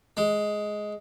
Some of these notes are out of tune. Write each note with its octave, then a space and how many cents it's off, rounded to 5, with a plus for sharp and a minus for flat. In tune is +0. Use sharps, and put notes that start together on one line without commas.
G#3 +10